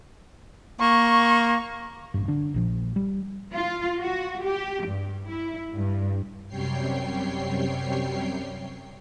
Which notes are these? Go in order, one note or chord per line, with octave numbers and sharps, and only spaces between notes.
A#3 C#6
A1 G2
D3 D4
A#1 A#2 F3
G3
F4
F#4
G4
G2
E4
G2
F#2 C3 G3 C#5 G5 C7